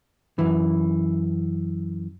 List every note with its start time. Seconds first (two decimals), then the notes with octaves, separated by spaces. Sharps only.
0.39 F#2 E3